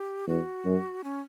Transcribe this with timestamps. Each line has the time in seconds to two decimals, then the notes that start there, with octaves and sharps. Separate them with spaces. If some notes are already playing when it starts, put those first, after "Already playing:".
Already playing: G4
0.27 E2 F#4
0.65 F#2
1.04 C#4